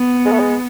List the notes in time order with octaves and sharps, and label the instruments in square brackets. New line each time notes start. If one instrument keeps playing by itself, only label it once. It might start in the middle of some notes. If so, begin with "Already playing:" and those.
Already playing: [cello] B3
[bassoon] G#3
A3
G#3